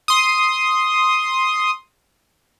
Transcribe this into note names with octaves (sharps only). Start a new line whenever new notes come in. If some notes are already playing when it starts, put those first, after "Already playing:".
C6 D#6